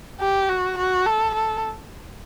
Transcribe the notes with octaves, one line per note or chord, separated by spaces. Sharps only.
G4
F#4
F#4
A4
A4